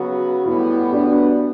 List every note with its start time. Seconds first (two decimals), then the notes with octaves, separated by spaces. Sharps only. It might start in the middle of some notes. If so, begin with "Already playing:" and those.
Already playing: C#3 F#3 B3 F#4
0.46 A2 G3 B3 E4
0.92 D4 F#4